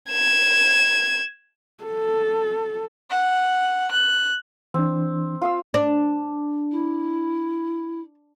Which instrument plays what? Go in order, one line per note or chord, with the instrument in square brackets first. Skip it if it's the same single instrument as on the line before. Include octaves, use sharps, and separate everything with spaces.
[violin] G#6 E7
[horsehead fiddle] A4
[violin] F#5
F#6
[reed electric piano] E3 D4 [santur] C4
[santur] F4 F5 E6
[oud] D4
[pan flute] E4